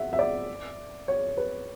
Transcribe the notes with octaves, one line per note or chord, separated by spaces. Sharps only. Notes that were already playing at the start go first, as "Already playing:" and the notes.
Already playing: E5 F#5
E5
D5
C#5
B4